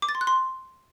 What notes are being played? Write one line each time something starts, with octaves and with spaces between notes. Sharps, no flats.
D6
A6
C6
F#6
C6